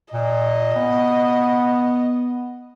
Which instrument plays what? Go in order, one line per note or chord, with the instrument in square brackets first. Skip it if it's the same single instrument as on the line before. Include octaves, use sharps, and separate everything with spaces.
[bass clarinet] A#2 [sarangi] D#5
[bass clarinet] B3